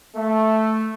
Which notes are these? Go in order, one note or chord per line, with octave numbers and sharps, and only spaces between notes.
A3